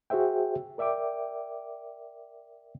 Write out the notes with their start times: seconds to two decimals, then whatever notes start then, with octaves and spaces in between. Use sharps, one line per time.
0.10 F#4 G#4 C5 E5 G5
0.78 A#4 D5 E5 G5 D6